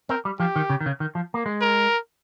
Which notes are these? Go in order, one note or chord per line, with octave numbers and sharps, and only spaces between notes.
C4 A#4
G3
F3 G4
D#3
C#3
D#3
C#3
D#3
F3
A#3
G#3
A#4